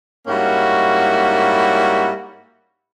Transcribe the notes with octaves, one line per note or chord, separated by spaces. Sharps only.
G#2 G3 A#3 C#4 E4 F#4